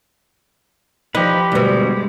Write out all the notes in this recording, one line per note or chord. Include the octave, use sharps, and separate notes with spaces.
F3 D#4 G4 B4
D2 G2 B2 G#3